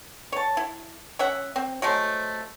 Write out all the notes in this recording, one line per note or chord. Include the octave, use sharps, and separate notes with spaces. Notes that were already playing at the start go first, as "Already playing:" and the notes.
C#5 A5
E4
C#4 E5 F#5
C4
F#3 G#3 A3 C5